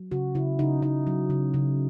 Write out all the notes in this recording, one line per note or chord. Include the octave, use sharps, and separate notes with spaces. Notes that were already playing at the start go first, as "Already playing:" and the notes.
Already playing: F#3
C#3 F#4
C#3 E4
C#3 D#4
C#3 D#4
F#3
C#3
C#3